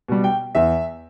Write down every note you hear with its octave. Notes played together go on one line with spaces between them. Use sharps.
B2 G3
G5
E2 E5